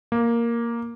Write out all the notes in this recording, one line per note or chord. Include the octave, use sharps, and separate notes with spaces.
A#3